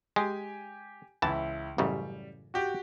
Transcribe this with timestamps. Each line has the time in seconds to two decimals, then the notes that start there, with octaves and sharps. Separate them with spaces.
0.16 G#3 G4 G#5
1.22 C#2 E3 E4 A5
1.78 A1 F#2 C#3 G3
2.54 F#4 G4